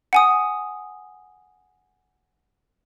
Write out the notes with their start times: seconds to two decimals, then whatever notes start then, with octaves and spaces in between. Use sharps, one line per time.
0.13 F#5 G#5 D#6